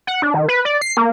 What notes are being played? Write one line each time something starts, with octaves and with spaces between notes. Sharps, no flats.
F#5
D4
D#3
B4
D5
C7
A#3